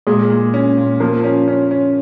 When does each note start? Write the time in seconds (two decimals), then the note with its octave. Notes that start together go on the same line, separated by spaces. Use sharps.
0.07 A#2 G#3
0.30 A#2
0.54 C#4
0.77 A#2
1.00 F3 A#3
1.24 C#4
1.48 C#4
1.71 C#4